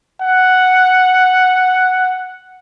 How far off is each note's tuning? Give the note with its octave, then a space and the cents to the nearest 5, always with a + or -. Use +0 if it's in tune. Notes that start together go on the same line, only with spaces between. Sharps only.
F#5 +0